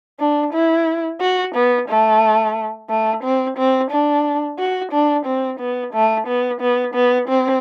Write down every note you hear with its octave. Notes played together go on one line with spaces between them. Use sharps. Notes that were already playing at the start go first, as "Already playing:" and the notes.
D4
E4
F#4
B3
A3
A3
C4
C4
D4
F#4
D4
C4
B3
A3
B3
B3
B3
C4